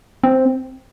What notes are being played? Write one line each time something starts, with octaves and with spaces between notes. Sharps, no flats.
C4